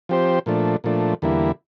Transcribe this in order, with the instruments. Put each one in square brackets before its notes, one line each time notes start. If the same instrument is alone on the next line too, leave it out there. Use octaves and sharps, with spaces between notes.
[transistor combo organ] F3 C4 G4 C5
A#2 F3 A3 D4
A#2 F3 A3 D4
E2 D3 G3 A#3 E4